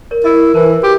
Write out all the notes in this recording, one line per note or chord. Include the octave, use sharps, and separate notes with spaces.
A#4 C#5
E4 A#4 D#5 E5
E3 A#4 C5 A5
F#4 G4